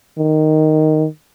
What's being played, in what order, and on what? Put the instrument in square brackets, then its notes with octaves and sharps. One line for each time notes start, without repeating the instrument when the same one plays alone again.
[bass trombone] D#3